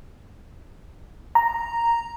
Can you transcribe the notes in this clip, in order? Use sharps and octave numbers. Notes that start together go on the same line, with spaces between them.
A#5